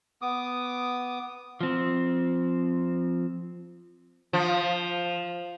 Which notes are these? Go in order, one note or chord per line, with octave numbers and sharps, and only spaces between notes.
B3 D6 D#6
F3 C4
F3